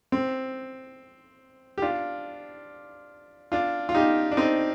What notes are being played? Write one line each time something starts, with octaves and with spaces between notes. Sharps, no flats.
C4
G4
D4 F4
D4 F4
F4
D#4 G4
D4
C4 D#4